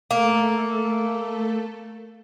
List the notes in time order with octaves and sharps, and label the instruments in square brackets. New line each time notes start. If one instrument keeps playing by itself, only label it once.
[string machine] A3 A4 [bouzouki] A#3